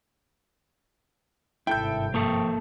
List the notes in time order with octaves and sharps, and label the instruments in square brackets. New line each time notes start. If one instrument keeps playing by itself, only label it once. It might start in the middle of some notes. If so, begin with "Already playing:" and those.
[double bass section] G#1 G2 C3 [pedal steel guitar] E4 A4 E5 [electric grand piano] G5 G6
[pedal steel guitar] F3 C#6 D#6 [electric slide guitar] A#3 A4